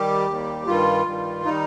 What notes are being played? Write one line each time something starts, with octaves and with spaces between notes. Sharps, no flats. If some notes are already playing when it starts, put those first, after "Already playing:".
Already playing: D#3 G3 G4
D#2 D#3 G3
G2 D#3 G3 F4
G2 D#3 G3
D#3 G3 D#4